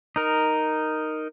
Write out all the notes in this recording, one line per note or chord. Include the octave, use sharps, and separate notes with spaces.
D#4 A#4